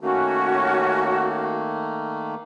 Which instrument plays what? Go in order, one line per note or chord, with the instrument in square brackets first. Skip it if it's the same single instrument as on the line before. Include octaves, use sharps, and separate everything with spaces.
[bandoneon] D#3 A3 A#3 [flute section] C#4 F#4